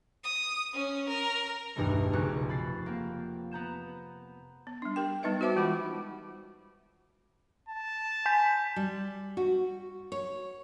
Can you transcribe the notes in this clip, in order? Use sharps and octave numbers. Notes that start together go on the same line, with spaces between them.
D#6
C#4
A#4
B1 E2 G2 B2 D#3 A3
F1 B1 C#3 C#6 F#6
B5 A6 C7
A#3 C4
B3 A#5 G6 E7
B3
G3 D4
G4 A#4 G5
G3 B3 D#4 B4 D#5 E5
F#4 B4 C5 E5 A5 D6
E3 G#3 F4 G4 B5 C#6
A5
G#5 G6 B6
G3
F#4
C#5